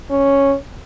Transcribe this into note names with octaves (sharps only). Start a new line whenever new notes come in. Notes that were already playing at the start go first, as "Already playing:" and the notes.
C#4